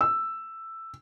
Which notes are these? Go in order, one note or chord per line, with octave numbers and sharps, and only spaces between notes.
E6